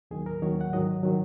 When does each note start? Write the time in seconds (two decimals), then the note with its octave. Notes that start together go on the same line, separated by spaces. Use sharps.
0.11 D#2 D#3 F#3 G#4
0.26 A#4
0.42 D#2 D#3 F#3 C#5
0.61 F#5
0.73 G#2 D#3 F#3 D#5
1.03 D#3 F#3